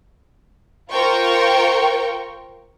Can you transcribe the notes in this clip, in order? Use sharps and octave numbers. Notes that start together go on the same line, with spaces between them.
F4 A#4 C5 G5 C#6